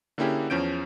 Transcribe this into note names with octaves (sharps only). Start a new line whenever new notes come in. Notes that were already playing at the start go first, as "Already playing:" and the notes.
D3 A#3 C#4 E4 G4 G#4
E2 F3 C#4 G6 D7